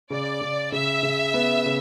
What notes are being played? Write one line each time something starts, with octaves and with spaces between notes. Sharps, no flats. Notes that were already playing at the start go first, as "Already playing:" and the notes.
C#3 D5
C#3
C#3 E5
C#3
B3
C#3